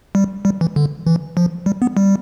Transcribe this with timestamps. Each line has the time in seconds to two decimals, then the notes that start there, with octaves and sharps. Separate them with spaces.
0.15 G3
0.45 G3
0.61 E3
0.76 D3
1.07 E3
1.37 F3
1.66 G3
1.82 B3
1.97 G3